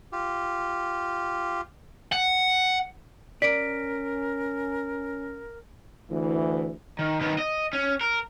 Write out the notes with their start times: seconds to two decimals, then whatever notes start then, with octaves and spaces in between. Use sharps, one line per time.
0.12 F4 G4
2.13 F#5
3.42 C#4 A#4 D5 B6 D7
6.11 D2 E3
6.99 D#3
7.21 D#3 B3
7.39 D#5
7.73 C#4
8.01 A#4